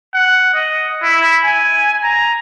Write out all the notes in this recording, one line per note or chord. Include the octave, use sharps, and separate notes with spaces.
F#5
D#5
E4
G#5
A#5